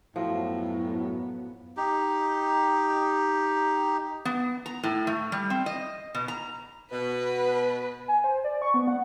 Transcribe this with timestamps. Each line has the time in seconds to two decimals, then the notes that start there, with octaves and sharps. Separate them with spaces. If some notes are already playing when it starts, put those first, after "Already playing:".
0.16 F#2 A2 F3 F#3 B3
1.77 D#4 G4
4.25 B3
4.66 A#5
4.83 A2
5.07 A3
5.32 G3
5.50 C4
5.66 D#5
6.15 B2
6.28 A#5
6.92 B2 B4
8.08 G#5
8.24 C5
8.44 D5
8.62 C#6
8.74 B3
8.88 F#5